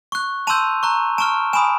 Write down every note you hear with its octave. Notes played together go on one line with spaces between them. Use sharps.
C#6 F#6
A5 C6 E6 G6 D#7 F7
A#5 C#6 F#6
A5 C#6 F6 D7 E7
G#5 B5 D#6 D7 E7